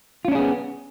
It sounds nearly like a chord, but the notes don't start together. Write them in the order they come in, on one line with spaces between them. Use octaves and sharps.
F4 C#4 D4 G#4 B3